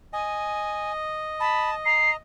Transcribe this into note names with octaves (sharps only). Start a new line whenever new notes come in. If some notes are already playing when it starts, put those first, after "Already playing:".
D#5 G#5
A5 B5
A#5 C7